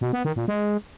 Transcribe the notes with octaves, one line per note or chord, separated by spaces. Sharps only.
B2
B3
D#3
A#2
G#3